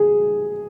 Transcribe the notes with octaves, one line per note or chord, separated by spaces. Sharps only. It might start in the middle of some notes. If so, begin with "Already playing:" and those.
Already playing: G#4